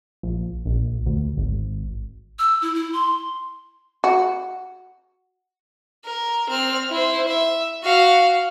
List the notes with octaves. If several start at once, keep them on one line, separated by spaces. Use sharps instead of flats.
A#1
A#1
D2
G#1
E6
E4
E4
C6
F#4
A#4
C4 F6
E4 C5
E5
F#4 F5